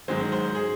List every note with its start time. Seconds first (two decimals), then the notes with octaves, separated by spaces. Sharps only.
0.08 G#2 D#3 F#3 C5
0.32 C5
0.55 G#4